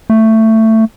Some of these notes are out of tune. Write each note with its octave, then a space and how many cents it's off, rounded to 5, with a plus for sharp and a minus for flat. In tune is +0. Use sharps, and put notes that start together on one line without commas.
A3 +15